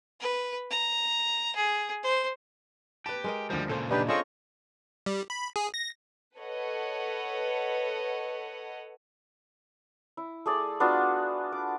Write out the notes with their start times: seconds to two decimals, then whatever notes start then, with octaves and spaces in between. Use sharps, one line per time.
0.20 B4
0.71 A#5
1.55 G#4
2.03 C5
3.06 G4 B4 A5
3.24 G#3 A#4 D#5
3.50 D2 F3 G3
3.69 A#2 C#3 A4 C5
3.91 D3 D4 D#4 G4 B4 D#5
4.09 C4 C#4 F4 G#4 A4 D#5 C#6
5.06 G3
5.30 B5
5.56 G#4
5.74 A#6
6.37 A4 B4 C#5 D#5 F#5
10.17 E4
10.46 A3 G#4 D5
10.80 B3 D4 F4 F#4
11.52 D6